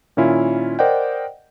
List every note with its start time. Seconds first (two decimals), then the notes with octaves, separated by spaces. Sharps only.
0.17 A#2 D#3 C#4 E4 F4
0.79 A#4 C5 D5 D#5 F#5 G5